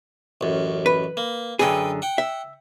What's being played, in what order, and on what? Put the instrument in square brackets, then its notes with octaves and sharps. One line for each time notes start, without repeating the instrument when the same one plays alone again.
[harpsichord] A1 F#2
[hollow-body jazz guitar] B4
[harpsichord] A#3
[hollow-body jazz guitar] F#2 D3 G#4 [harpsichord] B4 G5
[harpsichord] F#5 G5
[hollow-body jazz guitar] E5